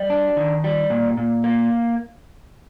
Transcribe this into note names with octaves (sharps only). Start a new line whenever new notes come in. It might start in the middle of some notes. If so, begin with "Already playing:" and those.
Already playing: G3 D#5
D4
D#3
G3
A#2
A#2
A#3